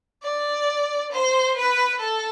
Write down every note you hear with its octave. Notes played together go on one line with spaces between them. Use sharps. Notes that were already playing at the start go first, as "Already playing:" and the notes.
D5
C5
B4
A4